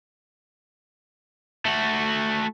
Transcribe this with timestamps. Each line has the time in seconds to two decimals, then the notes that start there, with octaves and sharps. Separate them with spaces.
1.66 A3 F#4